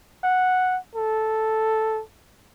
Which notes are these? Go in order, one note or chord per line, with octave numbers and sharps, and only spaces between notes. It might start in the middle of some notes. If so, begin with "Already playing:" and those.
F#5
A4